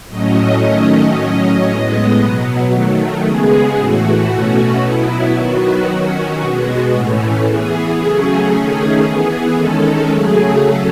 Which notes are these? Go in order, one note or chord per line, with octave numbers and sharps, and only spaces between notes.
A2 F#3 A3 C#4 D#5
D#3 F#3 A3 C#4
A2 F#3 C#4 D#5
A2 G#3 B3
B2 F#3 B3
D#3 F#3 A3
C#3 G#3 B3 G#4
A2 E3 A3 F#4
B2 A3 C#4
B2 F#3 B3 E4
D#3 F#3 B3 F#4
D#3 F#3 C#4
B2 G#3 B3
A2 E3 A3 C#4
E3 B3 G#4
C#3 F#3 A3 C#4
D#3 A3 C#4 G#4
E3 B3 G#4
D#3 G#3 C#4 A4
C#3 F#3 A3 G#4
F#3 C#4 A4